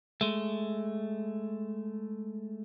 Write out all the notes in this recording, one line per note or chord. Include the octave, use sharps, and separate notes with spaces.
G#3 A3